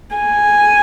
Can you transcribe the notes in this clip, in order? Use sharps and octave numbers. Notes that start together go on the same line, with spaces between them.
G#5